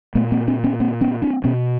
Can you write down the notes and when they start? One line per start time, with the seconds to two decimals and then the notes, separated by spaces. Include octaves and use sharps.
0.15 A#2 A3 B3
0.32 A#3 C4
0.48 C4 D4
0.64 B3 C#4
0.80 A#3 C4
1.01 B3 C#4
1.22 C4 D4
1.44 B2 B3 C#4